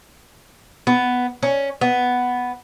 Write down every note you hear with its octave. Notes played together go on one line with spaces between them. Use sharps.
B3
C#4
B3